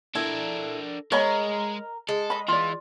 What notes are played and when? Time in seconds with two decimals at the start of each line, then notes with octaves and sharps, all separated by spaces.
0.15 D4 E4 A4 A#4
1.12 G#3 A#4 C#5 D#5 B5
2.09 G#3 A4
2.30 D#5 B5
2.48 E3 F4 D5